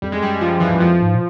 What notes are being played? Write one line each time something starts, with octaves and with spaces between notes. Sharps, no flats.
F2 G3
G#3
F#2 G3
F3
E3
F#2
F2 F3
G#2
A#2